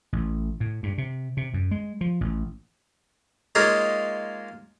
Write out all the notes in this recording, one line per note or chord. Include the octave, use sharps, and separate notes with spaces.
A1
A2
G2
C3
C3
F#2
G#3
F3
A1
G#3 A#3 D#4 F4 G#4 C#5